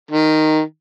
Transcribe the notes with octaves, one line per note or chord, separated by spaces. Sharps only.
D#3